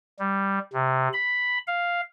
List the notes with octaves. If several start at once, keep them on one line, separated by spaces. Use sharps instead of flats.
G3
C3
B5
F5